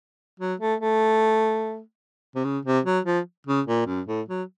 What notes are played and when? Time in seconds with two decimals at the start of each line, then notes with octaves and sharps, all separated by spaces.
0.40 F#3
0.60 A3
0.80 A3
2.35 C3
2.44 C#3
2.65 C3
2.85 F#3
3.05 F3
3.47 C#3
3.67 A#2
3.86 F#2
4.07 A2
4.28 F#3